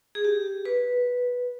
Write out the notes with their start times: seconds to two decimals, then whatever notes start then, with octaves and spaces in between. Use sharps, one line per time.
0.15 G#4
0.25 G4
0.65 B4